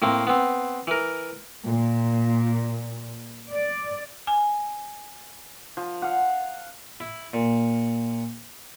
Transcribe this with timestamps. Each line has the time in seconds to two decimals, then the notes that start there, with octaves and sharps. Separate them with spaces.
0.02 A2 A#3 C4
0.27 B3 C4
0.87 E3 A#4
1.67 A#2
3.50 D5
4.27 G#5
5.77 F3
6.02 F5 F#5
7.00 E4
7.34 A#2